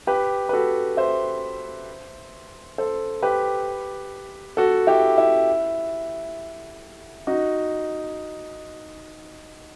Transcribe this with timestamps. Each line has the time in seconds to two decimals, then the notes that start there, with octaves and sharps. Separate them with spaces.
0.07 G4 B4
0.49 B4
0.53 F#4 A4
0.97 C5 E5
2.78 A4 C5
3.23 G4 B4
4.57 F#4 A4
4.87 E4 G4
5.18 E4
7.27 D#4 F#4